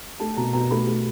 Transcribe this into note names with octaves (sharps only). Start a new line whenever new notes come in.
A3 A5
B2 A#5
B2 A#5
A3 B5
A3